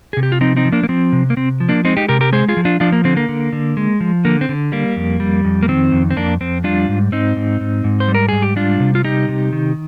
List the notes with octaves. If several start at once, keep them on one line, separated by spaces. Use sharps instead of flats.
C3 G#4
G4
F4
F3 C4 D#4
C4 D#4
F3
A#3 D4
A#3
F3 C4
C3
A#3
C3 C4
F3
A#3 D4
G#3 C4 D#4
D#4 G4
C3 G4 A#4
G4 A#4
G#3 G#4 C5
F4 G#4
F3
D4 F4
F3 D4 F4
A#3
D3 C4
A#3
D3
D3
G#3
F3
D3 A#3
C4
D3
G3 A#3
F2
G3
F2
A#3
D#3 C4
F2
C4
F2 A#3 D4
F2 C4
G3 D4 F4
G#2
G#2 C4 D#4
G#2
G#2
G#2
C5
G3
A#4
G#2 G#4
G4
G3 D4 F4
C3
F4
G3 D#4 G4
C3
D#3